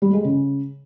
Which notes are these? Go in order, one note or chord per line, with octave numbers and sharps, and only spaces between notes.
G3
G#3
C#3